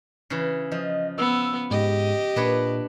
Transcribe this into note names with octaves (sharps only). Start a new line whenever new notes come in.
C#3 E3
F3 D#5
B3 E6
G#2 G4 D#5
A#2 D4 B4 C#5